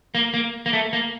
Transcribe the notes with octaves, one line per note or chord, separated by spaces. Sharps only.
A#3
A#3
A#3
A3
A#3